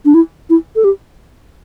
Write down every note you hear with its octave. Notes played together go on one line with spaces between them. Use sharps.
D4
E4
E4
A4
G4